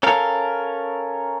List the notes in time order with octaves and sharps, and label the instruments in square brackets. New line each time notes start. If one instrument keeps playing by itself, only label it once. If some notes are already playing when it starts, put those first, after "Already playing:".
[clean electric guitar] C#4 A4 A#4 F5